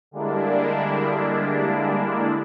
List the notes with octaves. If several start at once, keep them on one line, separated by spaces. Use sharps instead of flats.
D3 G3 G#3 A#3 D4 E4